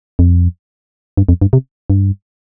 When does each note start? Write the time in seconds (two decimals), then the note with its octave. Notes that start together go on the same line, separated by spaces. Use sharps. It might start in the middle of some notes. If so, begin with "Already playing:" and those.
0.19 F2
1.17 G2
1.29 F2
1.42 G2
1.53 C3
1.90 G2